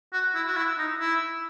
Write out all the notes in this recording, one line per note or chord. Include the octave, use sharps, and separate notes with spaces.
F#4
E4
F#4
E4
D#4
E4